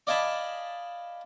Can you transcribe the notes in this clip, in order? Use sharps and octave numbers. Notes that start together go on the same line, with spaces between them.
D5 D#5 F5 G#5 A5 B5